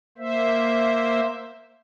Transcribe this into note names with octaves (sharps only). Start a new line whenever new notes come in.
A#3 C5 E5